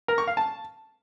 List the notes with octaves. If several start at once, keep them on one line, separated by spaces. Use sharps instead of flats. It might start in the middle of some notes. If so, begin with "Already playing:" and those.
A#4
C#6
F5
A5